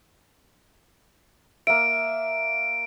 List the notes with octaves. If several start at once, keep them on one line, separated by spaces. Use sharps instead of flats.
A#3 E5 D7